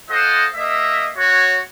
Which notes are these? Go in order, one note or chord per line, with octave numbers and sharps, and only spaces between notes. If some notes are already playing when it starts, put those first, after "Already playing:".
F4 A4 C5 D#5 F#5
A#3 D#5 E5
F#4 C#5